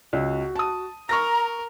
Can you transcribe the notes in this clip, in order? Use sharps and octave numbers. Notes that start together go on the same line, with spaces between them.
C#2 F#4
A5 D#6
A#4 A#5 C#6 F6 A#6